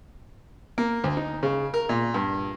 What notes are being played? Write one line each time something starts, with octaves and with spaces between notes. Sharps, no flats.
A#3
D2
D#4
C#3
A#4
A#2
G2